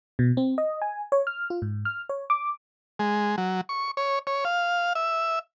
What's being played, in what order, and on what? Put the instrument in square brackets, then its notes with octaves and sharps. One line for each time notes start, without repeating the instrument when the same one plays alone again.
[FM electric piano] B2
C4
D#5
G#5
C#5
F6
F4
G#2
F6
C#5
D6
[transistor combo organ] G#3
F#3
C#6
C#5
C#5
F5
E5